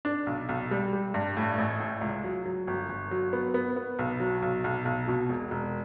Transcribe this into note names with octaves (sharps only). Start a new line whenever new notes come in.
D4
B1
B1
G3
G3
G2
A2
A1
A2
C#2
F#3
F#3
G1
G1
F#3
B3
B3
B3
B1
F#3
B1
B1
B1
B2
E1
E1